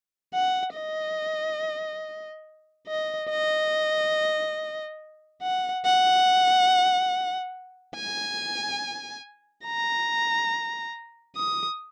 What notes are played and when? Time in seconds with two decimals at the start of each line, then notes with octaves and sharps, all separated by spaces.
0.34 F#5
0.75 D#5
2.88 D#5
3.30 D#5
5.42 F#5
5.85 F#5
7.96 G#5
9.66 A#5
11.36 D#6